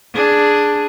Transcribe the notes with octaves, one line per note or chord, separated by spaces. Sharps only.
D4 G#4